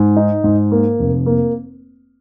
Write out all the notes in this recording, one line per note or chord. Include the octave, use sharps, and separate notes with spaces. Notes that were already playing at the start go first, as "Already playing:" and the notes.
Already playing: G#2
D#4
G#2
A#3
F1
A#3